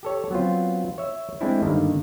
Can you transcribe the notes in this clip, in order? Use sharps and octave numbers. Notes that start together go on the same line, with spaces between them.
G4 A4 C#5
F#3 B3 C4 F4
C#5 E5
G#3 A3 C4 D4 E4
G2 D3 D#3 A#3